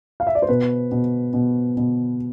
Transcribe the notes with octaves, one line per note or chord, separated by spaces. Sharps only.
F5
E5
D5
C5
B2 B4
B2
B2
B2